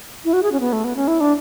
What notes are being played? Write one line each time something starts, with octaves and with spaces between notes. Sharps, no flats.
E4
F#4
G#4
C#4
B3
A3
B3
C#4
E4
D4